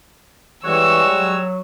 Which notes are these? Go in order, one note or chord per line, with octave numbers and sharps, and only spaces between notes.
E3 G3 G#3 F#4 C#5 E6
F#3